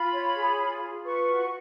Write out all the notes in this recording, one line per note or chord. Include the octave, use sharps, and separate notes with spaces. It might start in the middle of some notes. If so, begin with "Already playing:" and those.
Already playing: F4 B5
C#5
G#4
F4
F4
B4 C#6
F#4